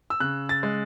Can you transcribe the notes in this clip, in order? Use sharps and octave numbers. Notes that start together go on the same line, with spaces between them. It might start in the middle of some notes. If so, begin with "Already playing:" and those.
E6
C#3 F#6
A6
G#3